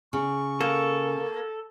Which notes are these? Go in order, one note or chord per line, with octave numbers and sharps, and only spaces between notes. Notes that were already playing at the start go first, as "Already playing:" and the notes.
C#3 C#6
A#3 A4